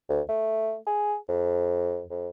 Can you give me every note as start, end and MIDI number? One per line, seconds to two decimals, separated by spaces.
0.09 0.21 38
0.29 0.76 57
0.87 1.15 68
1.28 2.04 41
2.10 2.29 41